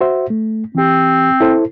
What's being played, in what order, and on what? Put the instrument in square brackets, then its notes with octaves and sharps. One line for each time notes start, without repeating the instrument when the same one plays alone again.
[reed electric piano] F#4 C5 E5
A3
[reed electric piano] E3 G4 [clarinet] C4
[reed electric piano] E4 A4 C5